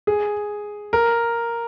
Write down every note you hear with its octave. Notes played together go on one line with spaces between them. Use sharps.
G#4
A#4